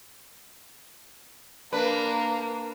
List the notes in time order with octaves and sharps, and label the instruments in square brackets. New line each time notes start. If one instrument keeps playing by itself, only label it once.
[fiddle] A#3 [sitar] D4 B4